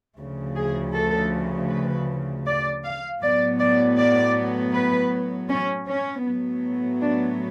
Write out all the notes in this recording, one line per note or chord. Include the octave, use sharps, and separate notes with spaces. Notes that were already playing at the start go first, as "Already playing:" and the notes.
D2 C#3 F3
G#4
A4
B4
D5
F5
A2 F#3 B3 D5
D5
D5
B4
C#4
C#4
A2 F#3 B3
D4